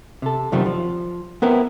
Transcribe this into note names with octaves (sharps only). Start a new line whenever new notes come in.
C3 A4
F#2 C3 D#3 F3 G3
F3
B3 C4 E4 A#4 B4